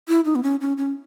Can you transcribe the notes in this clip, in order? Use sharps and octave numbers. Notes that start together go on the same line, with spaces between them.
E4
D#4
B3
C#4
C#4
C#4